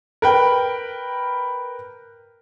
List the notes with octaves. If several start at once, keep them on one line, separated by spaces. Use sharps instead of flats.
A#4 B4 G5